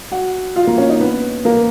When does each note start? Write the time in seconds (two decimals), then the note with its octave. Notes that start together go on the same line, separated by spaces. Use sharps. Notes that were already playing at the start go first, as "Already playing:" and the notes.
0.12 F#4 F#5
0.56 F4 F5
0.67 A#3 A#4
0.78 C#4 C#5
0.89 D#4 D#5
1.01 B3 B4
1.45 A#3 A#4